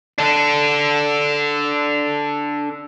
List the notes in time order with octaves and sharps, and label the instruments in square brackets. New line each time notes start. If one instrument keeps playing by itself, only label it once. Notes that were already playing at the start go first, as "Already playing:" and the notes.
[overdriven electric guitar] D4 A4